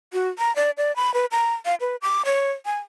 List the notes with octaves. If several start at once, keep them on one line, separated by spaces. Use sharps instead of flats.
F#4
A#5
D5
D5
B5
B4
A#5
F5
B4
D6
C#5
G#5